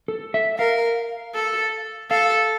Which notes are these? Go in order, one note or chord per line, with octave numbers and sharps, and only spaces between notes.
A4
E5
A#4 F5
A4
A4 F5